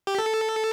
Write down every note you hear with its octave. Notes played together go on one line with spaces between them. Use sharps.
G4
A4